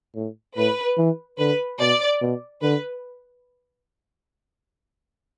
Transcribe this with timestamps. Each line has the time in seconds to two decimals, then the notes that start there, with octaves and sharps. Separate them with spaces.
0.15 A2
0.57 A2 B4
0.98 E3
1.39 D3 B4
1.80 B2 D5
2.21 B2
2.62 D3 B4